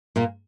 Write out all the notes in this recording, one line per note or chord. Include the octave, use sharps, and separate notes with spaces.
A#2 A#3